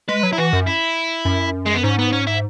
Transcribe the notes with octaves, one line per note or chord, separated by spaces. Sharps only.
G#3 B4
F#3
E4
E3 F#4
F#2
E4
F#2
G#3
B3
G#2 C#4
B3
C#4
E4